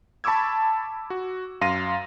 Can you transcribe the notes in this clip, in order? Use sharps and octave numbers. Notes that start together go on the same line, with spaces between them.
A5 B5 C#6 D6 E6 G#6
F#4
F#2 F5 C6 A#6 D#7